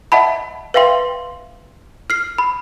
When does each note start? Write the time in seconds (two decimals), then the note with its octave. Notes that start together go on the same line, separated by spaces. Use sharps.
0.12 D#5 E5 F#5 A5 B5
0.74 B4 E5 F5 G5 C6
2.10 F6 C7
2.38 B5